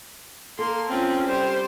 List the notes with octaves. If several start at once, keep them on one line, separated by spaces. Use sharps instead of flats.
A#3 A4 C6
C4 C#4 F4
G3 C5